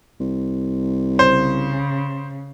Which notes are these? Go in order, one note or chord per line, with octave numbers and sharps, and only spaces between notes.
C2
C#3 C5